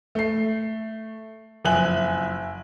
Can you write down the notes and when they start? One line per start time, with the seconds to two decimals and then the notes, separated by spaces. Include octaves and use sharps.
0.15 A3 C7
1.65 F#1 F2 E5 G#5 F#6 F#7